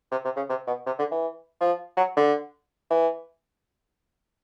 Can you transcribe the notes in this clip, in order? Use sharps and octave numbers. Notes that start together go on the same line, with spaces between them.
C3
C3
C#3
C3
B2
C3
D3
E3
F3
F#3
D3
E3